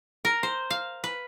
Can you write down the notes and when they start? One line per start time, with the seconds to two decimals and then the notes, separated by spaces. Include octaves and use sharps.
0.25 A#4
0.43 C5
0.70 F5
1.04 B4